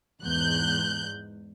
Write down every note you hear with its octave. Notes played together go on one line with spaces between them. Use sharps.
E2 G#2 F#6 G6